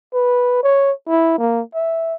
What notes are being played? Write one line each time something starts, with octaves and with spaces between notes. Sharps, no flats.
B4
C#5
E4
A#3
E5